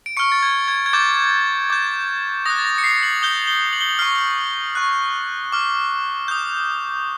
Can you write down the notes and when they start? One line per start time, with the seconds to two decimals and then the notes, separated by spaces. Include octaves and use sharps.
0.06 D7
0.17 C#6 F6 C#7
0.32 A6
0.42 G#6
0.68 G#6
0.86 G#6
0.93 D6 G6 A6
1.70 D6 G6
2.45 D#6 F#6 A#6
2.58 A6
2.64 A#6
2.78 C#7
2.84 C7
3.03 F#7
3.22 D#6 G6 G7
3.47 G7
3.73 F#7
3.81 G7
3.89 F#7
3.99 C#6 F6 C7
4.75 C#6 F#6
5.52 D6 F6
6.28 D#6 G6